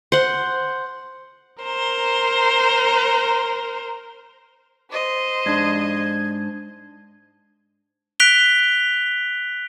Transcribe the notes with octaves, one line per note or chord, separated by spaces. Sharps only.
C5 F#5
A#4 C5 A#5
C5 D#5
G#2 D4 G#6
F#6 B6 D7 F7 G7